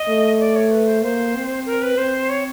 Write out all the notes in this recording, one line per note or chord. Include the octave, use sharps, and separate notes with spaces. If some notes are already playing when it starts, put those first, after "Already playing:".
Already playing: D#5
A3
D5
C#5
B4
C5
A#3 C5
C4
A#4
B4
C4 C5
C#5